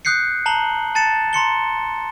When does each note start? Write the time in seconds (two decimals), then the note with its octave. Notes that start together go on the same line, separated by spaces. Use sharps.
0.05 D#6 F#6 G6 C7 C#7
0.46 A5 A#5 C7 F#7 G7
0.95 A5 A6 C#7 E7
1.33 A#5 C6 C#7 G7